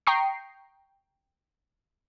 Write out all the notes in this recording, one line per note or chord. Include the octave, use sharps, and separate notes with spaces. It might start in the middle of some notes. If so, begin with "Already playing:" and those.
G5 A#5 C#6 D#6 C7